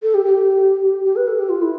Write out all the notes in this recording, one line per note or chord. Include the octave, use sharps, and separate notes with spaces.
A4
G4
G4
G4
B4
A4
G4
F4
E4